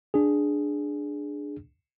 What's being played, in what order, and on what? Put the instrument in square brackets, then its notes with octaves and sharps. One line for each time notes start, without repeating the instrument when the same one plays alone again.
[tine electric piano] D4 G#4